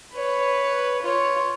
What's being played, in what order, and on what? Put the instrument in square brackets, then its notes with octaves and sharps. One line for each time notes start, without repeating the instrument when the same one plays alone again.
[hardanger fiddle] B4 C#5
F4 C#5